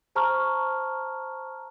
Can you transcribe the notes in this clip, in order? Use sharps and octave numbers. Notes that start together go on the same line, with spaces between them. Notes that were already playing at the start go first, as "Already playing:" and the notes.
C5 A5 A#5 C#6 F6